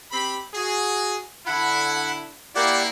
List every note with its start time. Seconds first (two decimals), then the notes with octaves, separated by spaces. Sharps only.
0.11 C4 G4 B5
0.55 F#4 G#4
1.47 D3 E4 F#5 B5
2.55 A#3 E4 G4 D5 F#5